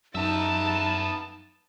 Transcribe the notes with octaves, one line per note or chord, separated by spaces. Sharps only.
F#2 B3 D#4 E5 A5